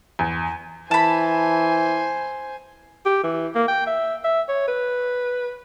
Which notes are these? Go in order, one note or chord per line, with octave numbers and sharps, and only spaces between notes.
E2
E3 C5 G#5 A5 B5
G4
E3
A#3
G5
E5
E5
C#5
B4